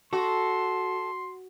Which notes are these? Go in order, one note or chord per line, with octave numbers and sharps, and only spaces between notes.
F#4 A4 C6